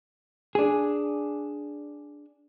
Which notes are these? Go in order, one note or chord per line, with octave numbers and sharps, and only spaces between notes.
D4 G#4